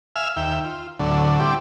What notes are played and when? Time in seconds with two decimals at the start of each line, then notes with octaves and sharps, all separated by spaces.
0.16 E5 F5 G#5 E6 F6
0.36 D#2 E5 G5
0.64 F4
0.99 D2 A2 D3 F#3
1.40 G3 C4 D4 E4 G4